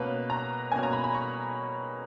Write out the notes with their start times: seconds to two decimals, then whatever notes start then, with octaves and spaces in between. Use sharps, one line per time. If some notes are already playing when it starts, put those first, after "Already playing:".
Already playing: B2 A#3 C#4 B4
0.30 A#5
0.72 B2 A#3 C#4 G#5
0.83 A#5
0.93 B5
1.04 B5
1.14 C#6